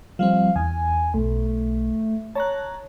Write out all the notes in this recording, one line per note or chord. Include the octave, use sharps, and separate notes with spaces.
F3 G3 C4 F5
E2 G#5
B1 A3
C#5 A5 A#5 F#6